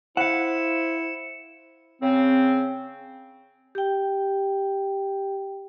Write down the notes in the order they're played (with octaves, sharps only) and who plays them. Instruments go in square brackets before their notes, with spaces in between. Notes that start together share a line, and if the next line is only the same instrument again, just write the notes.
[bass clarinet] E4 [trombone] C5 [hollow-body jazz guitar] F5 F#5 [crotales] C#7 E7
[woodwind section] C#3 C4
[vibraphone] G4 G5